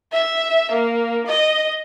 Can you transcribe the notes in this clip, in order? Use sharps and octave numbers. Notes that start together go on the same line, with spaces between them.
E5
A#3
D#5